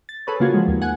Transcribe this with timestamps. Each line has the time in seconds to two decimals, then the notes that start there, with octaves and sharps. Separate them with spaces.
0.09 A6
0.27 G#4 A4 B4 C#5
0.40 C#3 A#3 F4 F#4 G#6
0.54 F3 G#3
0.68 D#2
0.82 F#5 G#5